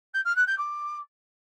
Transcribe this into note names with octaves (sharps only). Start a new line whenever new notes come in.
G6
F6
F#6
G6
D6